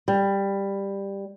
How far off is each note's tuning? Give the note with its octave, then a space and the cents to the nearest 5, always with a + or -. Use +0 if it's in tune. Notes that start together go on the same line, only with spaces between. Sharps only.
G3 +10